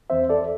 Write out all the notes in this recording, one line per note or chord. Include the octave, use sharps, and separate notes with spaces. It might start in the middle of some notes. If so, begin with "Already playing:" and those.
E2 E3 C4 C5 E5
A4 D5